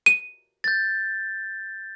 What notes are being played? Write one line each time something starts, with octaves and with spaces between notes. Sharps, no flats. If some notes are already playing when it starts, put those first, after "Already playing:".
D#7
G6 A6